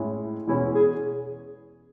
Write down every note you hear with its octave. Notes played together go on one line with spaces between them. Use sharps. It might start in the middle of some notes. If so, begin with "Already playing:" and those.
Already playing: A2 G#3 C#4 E4
E2 B2 G#3 C#4 E4
G#4